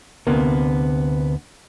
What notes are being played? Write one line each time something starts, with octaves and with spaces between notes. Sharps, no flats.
D2 C3 A#3 B3